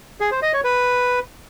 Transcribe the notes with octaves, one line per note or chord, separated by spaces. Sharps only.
G#4
C5
D#5
C#5
B4